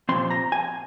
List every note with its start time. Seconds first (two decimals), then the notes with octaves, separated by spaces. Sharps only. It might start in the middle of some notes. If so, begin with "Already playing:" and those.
0.09 A#2 F3 C4 C6
0.31 A#5
0.52 G#5